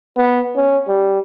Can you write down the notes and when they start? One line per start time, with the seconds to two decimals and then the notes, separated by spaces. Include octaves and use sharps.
0.17 B3
0.56 C#4
0.88 G3